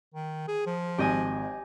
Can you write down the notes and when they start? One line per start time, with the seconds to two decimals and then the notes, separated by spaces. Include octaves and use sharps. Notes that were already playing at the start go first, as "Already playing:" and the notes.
0.14 D#3
0.48 G#4
0.66 F3
0.98 G#1 G4 D#5 G#5